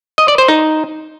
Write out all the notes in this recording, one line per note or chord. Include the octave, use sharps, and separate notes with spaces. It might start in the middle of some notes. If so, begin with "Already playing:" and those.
D#5
D5
C5
D#4